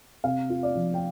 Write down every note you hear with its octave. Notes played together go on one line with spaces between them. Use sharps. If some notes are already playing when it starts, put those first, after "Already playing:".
C3 F5
F4
D5
F3
G5